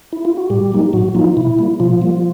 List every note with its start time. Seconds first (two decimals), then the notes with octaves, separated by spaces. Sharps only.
0.13 E4
0.25 F4
0.37 F#4
0.50 A2 G3 G4
0.72 F#3 A#3 D#4
0.93 A2 F#3 F#4
1.15 F3 F#3 A#3 D#4 F4
1.37 B2 E4
1.58 G3 A#3
1.80 B2 F3 F4
2.01 G3 A#3